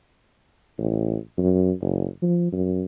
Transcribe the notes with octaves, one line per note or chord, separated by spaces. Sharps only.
A1
F#2
F#1
F3
F#2